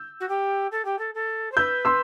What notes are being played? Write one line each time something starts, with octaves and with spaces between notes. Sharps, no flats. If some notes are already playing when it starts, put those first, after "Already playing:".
Already playing: E6 G6
F#4
G4
A4
G4
A4
A4
C5
B4 E6 G6
C6 E6